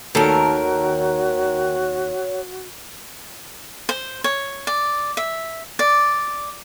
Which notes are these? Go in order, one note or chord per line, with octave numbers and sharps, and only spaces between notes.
D#2 D#3 F#4 A4 A#4 C#5
C5
C#5
D5
E5
D5